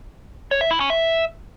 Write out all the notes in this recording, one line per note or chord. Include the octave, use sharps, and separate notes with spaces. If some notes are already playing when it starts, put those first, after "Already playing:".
C#5
E5
E4
C#4
E5